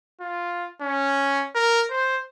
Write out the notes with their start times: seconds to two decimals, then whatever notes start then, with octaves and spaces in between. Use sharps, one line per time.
0.20 F4
0.81 C#4
1.55 A#4
1.90 C5